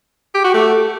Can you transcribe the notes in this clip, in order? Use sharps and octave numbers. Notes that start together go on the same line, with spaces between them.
G4
F#4
A3